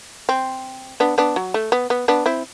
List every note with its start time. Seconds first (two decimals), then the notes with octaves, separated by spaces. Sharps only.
0.29 C4
1.00 B3 D4
1.18 B3 D4
1.36 F#3
1.54 A3
1.72 B3
1.90 B3
2.08 B3 D4
2.26 C4 E4